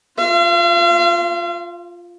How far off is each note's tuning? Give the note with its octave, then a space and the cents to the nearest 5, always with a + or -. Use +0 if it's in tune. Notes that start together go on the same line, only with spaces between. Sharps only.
F4 +0 F5 -40